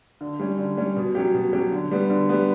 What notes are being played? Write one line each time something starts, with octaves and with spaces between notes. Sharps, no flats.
D3
G3 C#4
D3
G3 C#4
B2
F#3 C#4 G4
B2
F#3 C#4 G4
D3
G3 B3
D3
G3 B3